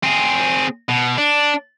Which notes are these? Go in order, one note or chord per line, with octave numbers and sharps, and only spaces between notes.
C4 G#4
B2
D4